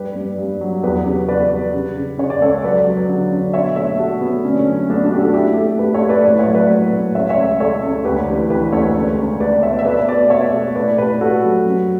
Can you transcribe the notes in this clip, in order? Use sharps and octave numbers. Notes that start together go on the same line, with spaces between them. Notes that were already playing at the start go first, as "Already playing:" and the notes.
Already playing: G2 G4 B4
G2
G2
F#3
E2 G4 B4
C#3
E2 B4 D5
G3
C#3
C#3
C#3 C#5
D5
C#2 A4 C#5
F#3 B4 D5
F#3
D3
D3
B2 C#5 E5
A3 C#5 E5
A3 F#4 A4
A3 B3
D3 C#4
C#4
F#2
C#4
A3 B3 D4
D4 F#4
A3 G4
F#4 A4
A3 E4 G4
A3
A3 G4 B4
A4 C#5
A3
B4 D5
A2 B4 D5
C#5 E5
F#3
B4 D5
A2
A2
C#2 C#5 E5
C#5 E5
C#2
C#2 A4 C#5
C#2
D2 G4 B4
E3
E3 G4 B4
D2 A4 C#5
C#2
C#2
A3 B4 D5
B2 C#5 E5
E5
A3 B4 D5
B2 B4 D5
B2 C#5 E5
A3
A2 B4 D5
A2 G4 B4
A3 F#4 A4
F#3
F#2